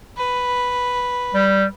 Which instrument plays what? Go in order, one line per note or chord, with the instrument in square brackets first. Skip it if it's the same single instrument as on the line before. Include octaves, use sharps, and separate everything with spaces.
[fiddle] B4
[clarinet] G3